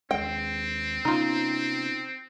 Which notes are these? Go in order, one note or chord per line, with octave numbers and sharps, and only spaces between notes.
D#2 G#3 C4 G5
C3 B3 C#4 D#4 F4